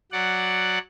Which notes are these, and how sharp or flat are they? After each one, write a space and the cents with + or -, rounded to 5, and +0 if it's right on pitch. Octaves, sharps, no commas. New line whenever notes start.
F#3 +0 D5 +0 F#5 +0